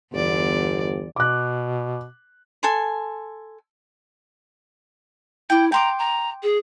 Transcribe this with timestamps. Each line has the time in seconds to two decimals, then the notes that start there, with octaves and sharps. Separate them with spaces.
0.13 G1 E2 D5
1.16 B2 D6 F#6
2.63 A4 G#5 C6
5.50 E4 G5 D6
5.72 G5 A#5 C6 D6
5.99 A#5
6.43 G#4